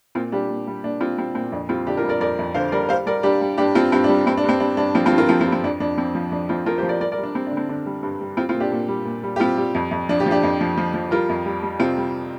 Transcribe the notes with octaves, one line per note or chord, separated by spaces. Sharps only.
A#2 C4 F4
G3 D4 G4
A#2
G3
A#2 D4
G3 C4 F4
G3 C4
A#2 C4
F2 D4
G3 C4 F4
D3 D4 G4
F4 A#4
G3
A#4 D5
F2 A#4 D5
F2
D3 C5 F5
G3 A#4 D5
G3 C5 F5
G3 A#4 D5
G3 D4 G4
G3
G2 D4 G4
G2 C4 F4
G2 C4
D4
G3
G2 C4
D4
G2
C4
G2 D4
G2 D4
F3 C4 F4
C4 F4
G2
F4 A#4
F3 C4 F4
C4 F4
G2
C4
F2 D4
F2 D4
F3 C4
F3
F2 D4
F2 C4 F4
F3 F4 A#4
G4 C5
F3
A#4 D5
G3 A#4 D5
A#4 D5
G3
D4
G3 C4
D4
D3
C4
D3 D4
G3
G2
G3
G3 C4 F4
C4 F4
A#2
D4 G4
A#2
G3
A#2
G3
G4
G3 C4 F4
G3
F2
F2
F3 D4
D4 G4
F3
D4 G4
F2
F3
F3
F3
G3 F4 A#4
F2
G3
G3
C3 C4 F4
G3